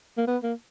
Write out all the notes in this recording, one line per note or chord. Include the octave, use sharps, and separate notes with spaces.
A#3
B3
A#3